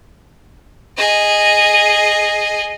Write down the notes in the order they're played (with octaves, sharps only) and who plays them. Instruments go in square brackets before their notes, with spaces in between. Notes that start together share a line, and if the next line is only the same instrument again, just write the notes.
[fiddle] G#4 D#5